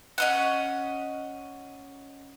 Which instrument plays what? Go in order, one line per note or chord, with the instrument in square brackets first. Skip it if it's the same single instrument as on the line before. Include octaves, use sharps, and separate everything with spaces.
[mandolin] C#4 D#5 F#5